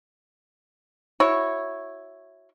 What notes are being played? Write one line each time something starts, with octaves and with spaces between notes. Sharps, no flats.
E4 F#4 C#5